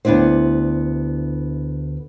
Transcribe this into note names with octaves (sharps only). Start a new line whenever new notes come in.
D2 B3 D4 E4 C5